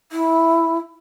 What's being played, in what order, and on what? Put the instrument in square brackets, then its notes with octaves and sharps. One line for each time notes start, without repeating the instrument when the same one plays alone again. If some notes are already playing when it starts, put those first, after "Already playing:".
[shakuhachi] E4